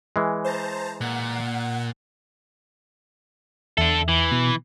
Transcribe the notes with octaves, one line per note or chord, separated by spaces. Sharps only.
E3 G#3
C5 A5 A#5
A#2 F#5
E2 D4 A4 E5
E3
B2